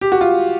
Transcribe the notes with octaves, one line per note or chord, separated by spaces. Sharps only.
G4
F#4
F4